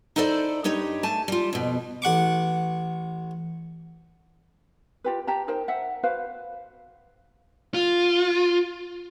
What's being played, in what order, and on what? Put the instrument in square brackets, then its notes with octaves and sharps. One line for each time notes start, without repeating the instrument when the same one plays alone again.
[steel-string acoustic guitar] D#4 E4 A4 C5 D5
G2 D#4 G4 C#5 D#5
A3 G#5 A5
G3 F4
F2 B2
[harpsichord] A1 F#5 C#6 D6
[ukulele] F4 G4 B4
G4 A5 A#5
D#4 A#4 C5 G5
C5 E5 F#5
F#4 B4 C5 F5
[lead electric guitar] F4